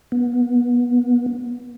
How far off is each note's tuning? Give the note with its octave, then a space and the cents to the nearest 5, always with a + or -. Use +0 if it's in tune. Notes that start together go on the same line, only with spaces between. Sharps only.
B3 -25